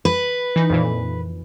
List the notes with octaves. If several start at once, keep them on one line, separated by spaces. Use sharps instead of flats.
B4
E3 D#4
F2 A#2 E3